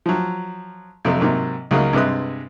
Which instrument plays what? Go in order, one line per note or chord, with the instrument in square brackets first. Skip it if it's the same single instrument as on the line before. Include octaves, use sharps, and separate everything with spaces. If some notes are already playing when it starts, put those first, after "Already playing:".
[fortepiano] F3 F#3
F2 C3 F#3 A3
G#2 C3 F#3 A#3
C#2 C#3 F#3 A#3 D#4 D#5
G2 C3 G#3 B4 D#6